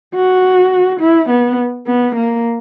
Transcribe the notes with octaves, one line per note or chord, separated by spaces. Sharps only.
F#4
E4
B3
B3
A#3